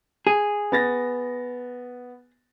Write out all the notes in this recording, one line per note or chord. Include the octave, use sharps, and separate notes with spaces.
G#4
B3 A6 A#6